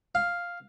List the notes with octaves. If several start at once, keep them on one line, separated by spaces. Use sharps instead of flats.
F5